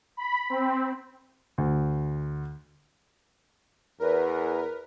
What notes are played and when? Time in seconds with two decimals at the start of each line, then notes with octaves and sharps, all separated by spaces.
0.17 B5
0.50 C4
1.58 D2
4.00 E2 A#4 B4